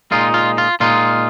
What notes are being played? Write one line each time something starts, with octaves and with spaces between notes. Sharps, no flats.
A#2 G#3 D#4 F4
F4
F4
A#2 G#3 D#4 F4